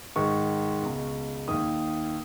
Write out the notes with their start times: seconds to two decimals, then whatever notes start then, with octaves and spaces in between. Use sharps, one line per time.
0.16 G#2 D#3 C#6
0.82 C#2 B2
1.48 D#2 D#3 D#6